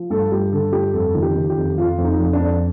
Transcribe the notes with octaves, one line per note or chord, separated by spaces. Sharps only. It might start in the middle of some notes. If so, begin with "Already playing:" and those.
Already playing: F3
G2 A4
G2 G4
D3 A4
G2 G4
F2 A4
D#3
G4
D#3
G4
F2
F2 F4
F2
D#4
F2
D4
F2